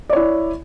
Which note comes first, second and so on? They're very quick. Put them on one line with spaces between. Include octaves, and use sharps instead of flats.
D5 C#5 E4